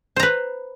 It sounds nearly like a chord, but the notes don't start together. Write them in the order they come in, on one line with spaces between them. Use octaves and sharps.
C5 A#5 B4